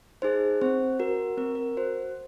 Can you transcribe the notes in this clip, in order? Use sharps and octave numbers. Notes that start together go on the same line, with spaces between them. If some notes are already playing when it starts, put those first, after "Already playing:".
D#4 G#4 C5
C4 C5
F#4 A#4
C4 A#4
A#4
F#4 C5